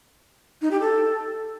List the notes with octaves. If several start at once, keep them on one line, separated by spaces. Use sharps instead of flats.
D#4
G4
A4